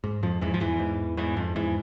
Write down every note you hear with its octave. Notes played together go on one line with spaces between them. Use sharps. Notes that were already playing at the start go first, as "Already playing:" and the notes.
G#2
F2 F3
E2 G#2 E3
F3
E2 E3
G#2
E2 G#2 E3
F2 F3
E2 G#2 E3